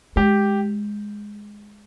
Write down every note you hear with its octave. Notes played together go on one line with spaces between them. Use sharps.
G#3 G4